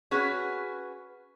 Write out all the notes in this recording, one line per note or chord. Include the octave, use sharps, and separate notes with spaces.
C#4 F#4 G#4 B4